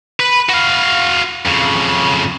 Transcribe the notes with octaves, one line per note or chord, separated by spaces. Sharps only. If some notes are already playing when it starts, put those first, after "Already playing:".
B4
F#4 F5
F2 C#3